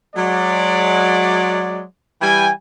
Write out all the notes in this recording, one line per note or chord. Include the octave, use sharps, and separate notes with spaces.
F#3 G#3 D5
E3 G3 G5 G#5